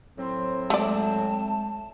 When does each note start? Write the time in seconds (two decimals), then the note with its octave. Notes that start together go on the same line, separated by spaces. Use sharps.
0.18 A2 F#3 C4 C5 C6
0.70 G#3 A3 D5 E5 A5